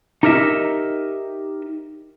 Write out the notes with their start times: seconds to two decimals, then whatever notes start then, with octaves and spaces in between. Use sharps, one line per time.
0.23 D#4 G4 A#4 D#5 E5